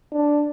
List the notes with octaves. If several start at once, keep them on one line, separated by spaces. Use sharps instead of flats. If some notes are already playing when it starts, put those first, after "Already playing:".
D4